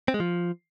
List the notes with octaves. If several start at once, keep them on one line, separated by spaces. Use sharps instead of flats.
C4
G#3
F3